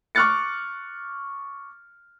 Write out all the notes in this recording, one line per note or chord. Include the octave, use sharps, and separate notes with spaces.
C#6 D6 F6 F#6 A6 C#7